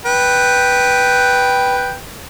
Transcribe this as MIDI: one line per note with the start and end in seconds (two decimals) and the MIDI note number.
0.06 1.95 71
0.06 1.95 79